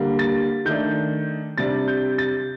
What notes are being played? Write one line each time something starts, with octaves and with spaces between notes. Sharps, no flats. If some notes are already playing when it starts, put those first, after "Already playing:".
Already playing: D3 G3 A#3
A6
D#3 A3 D4 G6
C3 G3 D4 A6
G6
A6